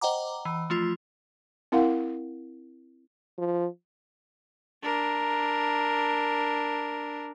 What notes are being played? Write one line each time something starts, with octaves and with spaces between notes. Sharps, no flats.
C5 D#5 F#5 G5 A#5 D6
E3
F3 A3 F4
C4 E4 A#4 F5 F#5
F3
D4 A#4